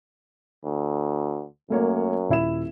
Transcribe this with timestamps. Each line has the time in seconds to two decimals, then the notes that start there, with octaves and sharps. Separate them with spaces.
0.64 D2
1.70 F#2 A3 A#3 C#5
2.29 D#1 E4 E7